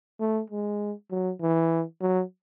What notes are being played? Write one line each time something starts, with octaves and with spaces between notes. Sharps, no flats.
A3
G#3
F#3
E3
F#3